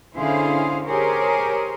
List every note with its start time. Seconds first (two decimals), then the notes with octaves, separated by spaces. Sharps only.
0.17 D3 C#4 E4 G#4 C5 F5
0.87 G4 G#4 A#4 C5 C#5